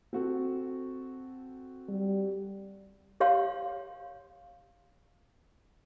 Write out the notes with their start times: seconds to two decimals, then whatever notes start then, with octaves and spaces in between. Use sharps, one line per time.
0.13 C4 F#4 A4
1.89 G3
3.20 G4 C#5 F5 C6